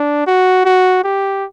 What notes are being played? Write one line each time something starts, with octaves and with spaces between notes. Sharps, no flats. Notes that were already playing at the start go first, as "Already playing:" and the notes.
Already playing: D4
F#4
F#4
G4